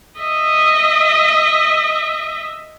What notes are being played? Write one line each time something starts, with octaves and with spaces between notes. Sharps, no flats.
D#5 E5